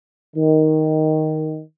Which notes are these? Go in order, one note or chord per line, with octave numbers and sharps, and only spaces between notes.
D#3